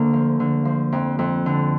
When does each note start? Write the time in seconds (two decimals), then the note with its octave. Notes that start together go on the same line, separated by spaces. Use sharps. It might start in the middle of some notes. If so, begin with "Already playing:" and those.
Already playing: D2 D3 A#3
0.13 F3
0.40 D3
0.65 F3
0.92 F2
1.19 F2
1.46 D3